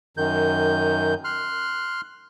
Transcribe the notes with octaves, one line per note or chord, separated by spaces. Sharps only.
F#2 D#3 G6
C6 F6 F#6